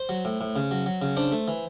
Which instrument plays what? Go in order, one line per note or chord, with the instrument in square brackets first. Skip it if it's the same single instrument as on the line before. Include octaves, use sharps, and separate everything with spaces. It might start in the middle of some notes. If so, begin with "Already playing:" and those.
Already playing: [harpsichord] C5
F#3
A2
A2
C#3
F#3
F#3
C#3
D4 C5
A3
E3